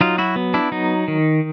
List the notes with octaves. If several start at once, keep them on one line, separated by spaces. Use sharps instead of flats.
F#3 D#4 F4
E4 F#4
B3
D4 E4
F#3 D#4
D#3